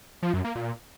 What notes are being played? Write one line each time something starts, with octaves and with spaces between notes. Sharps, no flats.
F3
F#2
A#3
A#2